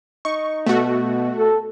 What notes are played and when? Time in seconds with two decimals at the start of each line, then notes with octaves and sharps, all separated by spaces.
0.25 D#4 C#6
0.66 B2 A3 F#4
1.37 A4